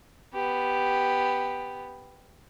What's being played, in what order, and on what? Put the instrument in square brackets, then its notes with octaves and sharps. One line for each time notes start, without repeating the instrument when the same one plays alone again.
[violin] B3 G4